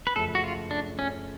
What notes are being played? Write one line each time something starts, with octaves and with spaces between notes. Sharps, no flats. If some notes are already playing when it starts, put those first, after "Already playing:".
B4
F#2 C#3 F3 A3 C#4 A4
F#4
F4
D4
C#4